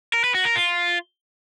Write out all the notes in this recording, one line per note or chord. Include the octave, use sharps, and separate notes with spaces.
A#4
B4
F#4
A#4
F4